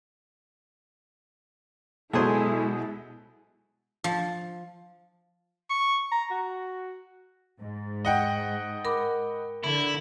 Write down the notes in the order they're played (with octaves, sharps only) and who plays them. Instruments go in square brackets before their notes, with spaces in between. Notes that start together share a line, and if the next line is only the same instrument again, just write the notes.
[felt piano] B2 [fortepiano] F#3 G#4 C5 [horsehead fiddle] G#3 E4 [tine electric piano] A4 G#5
[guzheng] F3
[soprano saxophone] C#6
A#5
F#4
[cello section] G#2
[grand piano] D#5 F#5 G5
[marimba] A#4 B5 D6
[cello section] D3 [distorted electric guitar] E4